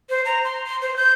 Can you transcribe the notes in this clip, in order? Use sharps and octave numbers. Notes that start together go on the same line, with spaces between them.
C5
A#5
C6
C6
C5
G6